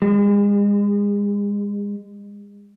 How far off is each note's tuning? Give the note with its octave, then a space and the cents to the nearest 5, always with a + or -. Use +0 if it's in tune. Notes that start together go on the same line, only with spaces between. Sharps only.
G#3 -35